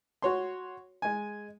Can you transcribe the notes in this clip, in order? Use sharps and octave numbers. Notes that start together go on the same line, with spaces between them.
F#4 C#5 C6
G#3 G#5